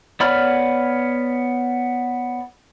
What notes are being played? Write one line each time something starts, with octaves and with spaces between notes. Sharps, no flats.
B3 C#5 D5 B5 F6